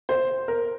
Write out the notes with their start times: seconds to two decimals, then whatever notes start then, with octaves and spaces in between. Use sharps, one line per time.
0.09 C5
0.48 A#4